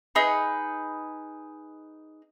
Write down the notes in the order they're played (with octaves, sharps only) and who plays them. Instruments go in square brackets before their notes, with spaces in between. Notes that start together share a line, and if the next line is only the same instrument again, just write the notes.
[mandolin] D#4 G#4 B4